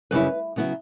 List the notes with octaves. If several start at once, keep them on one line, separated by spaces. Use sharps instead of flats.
F#2 C#3 G3 C#4 E4 B4
C#3 F#3 B3 E4